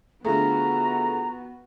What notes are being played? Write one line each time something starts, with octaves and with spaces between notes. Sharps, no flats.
D3 A3 B3 F4 F#4 G#4 A#5